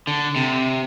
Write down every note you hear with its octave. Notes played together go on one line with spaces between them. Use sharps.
D3
C3